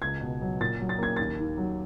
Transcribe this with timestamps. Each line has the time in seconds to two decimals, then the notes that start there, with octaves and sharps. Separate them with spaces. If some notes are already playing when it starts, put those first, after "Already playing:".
0.02 C#2 G#6
0.21 B2
0.42 F#3
0.60 A#2 A6
0.80 F#3
0.89 A6
0.99 A#3 G#6
1.16 D#2 A6
1.38 D#3
1.57 F#3